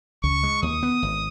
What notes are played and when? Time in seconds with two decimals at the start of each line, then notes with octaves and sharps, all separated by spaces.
0.23 C#2 C#6
0.43 G#3
0.62 D#2 D#6
0.83 B3
1.02 G#1